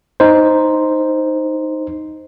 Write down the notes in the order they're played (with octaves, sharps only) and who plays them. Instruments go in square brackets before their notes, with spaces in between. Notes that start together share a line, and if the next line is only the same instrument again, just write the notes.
[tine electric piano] D#4 C5